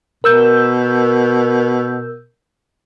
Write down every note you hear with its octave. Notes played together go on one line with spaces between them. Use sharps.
B2 A#4 E6 G6